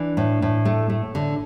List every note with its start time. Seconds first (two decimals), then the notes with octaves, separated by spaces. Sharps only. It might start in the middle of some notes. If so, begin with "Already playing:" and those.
Already playing: E3 D4
0.17 A2
0.42 A2
0.65 A3
0.90 A3
1.15 D3